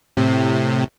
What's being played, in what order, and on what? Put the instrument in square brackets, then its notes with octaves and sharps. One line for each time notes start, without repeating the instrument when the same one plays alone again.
[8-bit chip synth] A2 C3